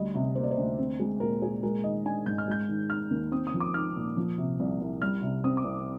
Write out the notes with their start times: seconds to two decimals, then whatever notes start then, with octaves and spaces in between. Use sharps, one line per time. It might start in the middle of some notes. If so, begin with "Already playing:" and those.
Already playing: D2 G3 D#5
0.15 C3
0.35 A#3 C5
0.43 D5
0.51 C5
0.58 D2
0.79 C4
1.00 G#3
1.20 A#2 A#4
1.41 A#2 G#4
1.63 G#3 A#4
1.83 D#3 D#5
2.05 D4 G#5
2.26 G#2 G6
2.38 F6
2.48 G#3 G6
2.68 D#3
2.90 D#4 F6
3.11 D#2
3.32 C4 D#6
3.47 D#6
3.54 F3
3.60 D6
3.74 D#4 F6
3.96 A#2
4.17 F3
4.38 C3
4.60 C2
4.81 C2
5.02 G3 F6
5.22 C3
5.44 C4 D#6
5.57 D6
5.64 C2